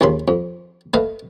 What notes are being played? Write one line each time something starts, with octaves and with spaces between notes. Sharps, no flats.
A#1 D#2 C#3 B5 C6
F2
A3 B4 D#5 F5